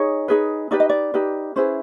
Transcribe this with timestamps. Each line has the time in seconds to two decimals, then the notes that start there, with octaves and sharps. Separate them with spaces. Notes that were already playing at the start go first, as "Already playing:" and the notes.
Already playing: D#4 G#4 C#5
0.28 D#4 G#4 B4
0.71 D#4 G4 B4 D5
0.80 D#5
0.90 D5
1.14 D#4 G4 B4
1.56 C#4 E4 G#4 B4 C5